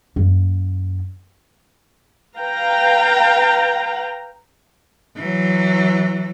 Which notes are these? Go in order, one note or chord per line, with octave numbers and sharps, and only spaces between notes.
F#2 A#3
B4 F5 G5 A#5
E3 F#3